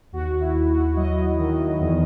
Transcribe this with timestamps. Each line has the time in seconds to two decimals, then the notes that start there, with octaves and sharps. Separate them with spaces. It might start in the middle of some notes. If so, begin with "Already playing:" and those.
0.12 D#2 F#4
0.41 E4
0.54 D#2
0.69 F#4
0.96 F#3 D#5
1.39 D#3
1.80 E2